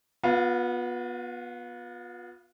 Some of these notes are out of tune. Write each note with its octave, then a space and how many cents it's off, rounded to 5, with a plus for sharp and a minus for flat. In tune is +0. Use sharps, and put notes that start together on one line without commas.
B3 -15 F4 +35 F5 -20